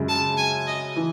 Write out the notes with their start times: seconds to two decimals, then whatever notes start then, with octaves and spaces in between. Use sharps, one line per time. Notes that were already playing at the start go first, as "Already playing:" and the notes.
Already playing: F#2 C#3 G#3
0.08 A5
0.37 G#5
0.67 D#5
0.96 E3